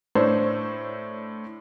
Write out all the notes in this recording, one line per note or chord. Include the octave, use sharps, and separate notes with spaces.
A2 D4 C5 C#5 E6